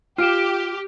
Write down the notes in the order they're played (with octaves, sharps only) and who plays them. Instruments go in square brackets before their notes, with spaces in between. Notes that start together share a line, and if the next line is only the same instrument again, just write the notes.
[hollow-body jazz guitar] F4 [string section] G4 [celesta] F6 D7 E7